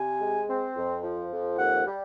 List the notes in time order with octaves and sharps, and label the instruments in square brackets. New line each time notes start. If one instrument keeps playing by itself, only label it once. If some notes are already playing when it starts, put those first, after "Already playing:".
Already playing: [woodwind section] C3 G#5
G#3
C4
F2
F3
F2
D#2 F#5
G3